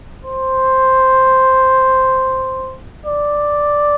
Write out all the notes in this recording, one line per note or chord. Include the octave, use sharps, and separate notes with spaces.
C5
D5